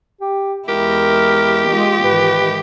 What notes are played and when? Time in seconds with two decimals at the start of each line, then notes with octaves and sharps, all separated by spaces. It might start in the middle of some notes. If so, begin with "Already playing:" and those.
0.21 G4
0.69 E2 G#3 E4 G4 A#4
1.68 G#3 D#4 F4
2.04 G#2 D#3 E3 B4